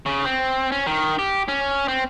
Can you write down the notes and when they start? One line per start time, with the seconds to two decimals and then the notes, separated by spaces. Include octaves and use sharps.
0.06 C#3
0.25 C4
0.72 C#4
0.86 D#3
1.19 G4
1.48 C#4
1.88 C4